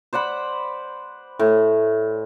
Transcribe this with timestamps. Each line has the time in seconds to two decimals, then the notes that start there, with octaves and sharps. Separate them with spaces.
0.13 C5 D5 F#5 B5
1.39 A2